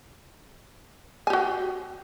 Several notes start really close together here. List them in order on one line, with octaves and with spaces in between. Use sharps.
G#5 G4 F#4